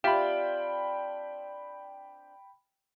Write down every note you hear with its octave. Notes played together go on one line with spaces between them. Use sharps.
C4 D4 F4 G4 E5 G5 B5